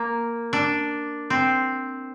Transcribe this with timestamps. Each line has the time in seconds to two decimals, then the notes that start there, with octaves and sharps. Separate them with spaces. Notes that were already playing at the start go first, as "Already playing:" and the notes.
Already playing: A#3
0.53 D4
1.30 C4